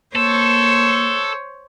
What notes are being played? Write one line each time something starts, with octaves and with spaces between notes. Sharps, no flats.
A#3 A4 C5 C#5